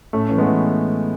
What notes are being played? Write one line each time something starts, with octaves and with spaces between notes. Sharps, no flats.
A2 A3 C#4
E3 C#4
G#3 B3
E3